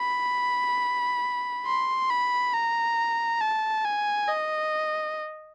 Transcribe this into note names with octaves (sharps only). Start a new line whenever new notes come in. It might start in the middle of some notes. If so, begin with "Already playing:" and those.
Already playing: B5
C6
B5
A#5
A5
G#5
D#5